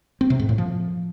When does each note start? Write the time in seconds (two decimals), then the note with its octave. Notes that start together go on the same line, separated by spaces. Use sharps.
0.21 C4
0.30 C3
0.39 G#2
0.49 A2
0.58 F3